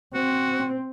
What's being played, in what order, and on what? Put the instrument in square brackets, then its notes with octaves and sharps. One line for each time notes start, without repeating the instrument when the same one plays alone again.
[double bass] C4 [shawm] F#4